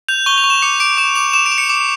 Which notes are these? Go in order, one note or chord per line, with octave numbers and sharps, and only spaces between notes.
G6 F7
C#6 G7
F7
C#6
E7
D6 C#7
D6 D7
D6 E7
D6 F7
D6 E7
D7
D6
C#7
D6